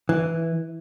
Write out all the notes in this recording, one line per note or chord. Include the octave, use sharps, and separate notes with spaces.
E3